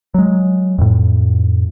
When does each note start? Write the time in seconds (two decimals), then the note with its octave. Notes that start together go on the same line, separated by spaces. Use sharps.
0.14 F#3 G#3
0.78 F2 A2